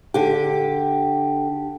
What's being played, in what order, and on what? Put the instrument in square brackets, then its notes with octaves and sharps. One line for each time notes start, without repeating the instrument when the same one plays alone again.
[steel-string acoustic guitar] D3 G4